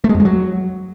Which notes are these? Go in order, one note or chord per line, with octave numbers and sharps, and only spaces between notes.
A3
G#3
F2
G#3
F#3